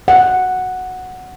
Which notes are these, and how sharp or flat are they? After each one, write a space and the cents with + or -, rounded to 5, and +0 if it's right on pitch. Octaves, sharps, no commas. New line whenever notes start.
F#5 -5